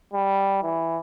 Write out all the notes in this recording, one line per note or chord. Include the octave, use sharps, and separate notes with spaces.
G3
E3